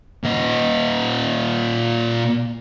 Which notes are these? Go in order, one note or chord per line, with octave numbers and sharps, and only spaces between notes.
A#2 D#5